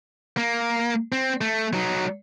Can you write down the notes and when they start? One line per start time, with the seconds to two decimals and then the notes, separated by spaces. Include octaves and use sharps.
0.37 A#3
1.12 C4
1.41 A3
1.73 F#3 D#4